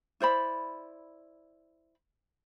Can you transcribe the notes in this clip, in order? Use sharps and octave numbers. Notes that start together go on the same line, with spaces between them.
E4 C5 D5 B5